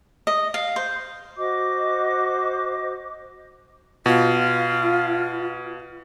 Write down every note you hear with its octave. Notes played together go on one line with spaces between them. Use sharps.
D#5
F5
C5
F#4 C5 D#5 D6
B2 F4